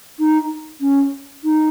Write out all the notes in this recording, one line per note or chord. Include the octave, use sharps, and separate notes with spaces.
D#4
C#4
D#4